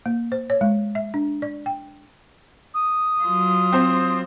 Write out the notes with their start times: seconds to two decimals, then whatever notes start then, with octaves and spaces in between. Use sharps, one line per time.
0.06 A#3
0.32 C5
0.50 C#5
0.61 G#3
0.95 E5
1.14 D4
1.42 D5
1.66 G5
2.74 D#6
3.22 F#3 F4
3.72 C4 C5